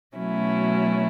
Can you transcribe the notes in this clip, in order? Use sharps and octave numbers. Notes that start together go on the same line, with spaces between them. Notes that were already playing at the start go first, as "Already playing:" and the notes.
B2 F#3 A3 C#4 E4